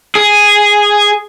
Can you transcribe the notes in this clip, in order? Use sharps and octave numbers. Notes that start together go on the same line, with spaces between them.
G#4